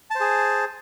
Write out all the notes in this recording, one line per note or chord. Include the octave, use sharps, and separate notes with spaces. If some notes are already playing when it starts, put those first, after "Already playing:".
G#4 C5 A5